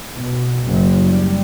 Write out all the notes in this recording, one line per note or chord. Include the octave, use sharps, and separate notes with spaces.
B2
F#1
G3